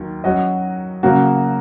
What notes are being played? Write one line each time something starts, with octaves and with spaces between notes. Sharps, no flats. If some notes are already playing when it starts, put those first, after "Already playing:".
Already playing: D#2 D#3 F#3
F#3 C#4 F#4 D#5
C#3 F#3 A#3 F#4